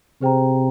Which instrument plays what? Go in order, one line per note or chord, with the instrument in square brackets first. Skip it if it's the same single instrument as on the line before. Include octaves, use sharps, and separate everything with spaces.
[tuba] C3 [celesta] G#4 C5 G5 A#5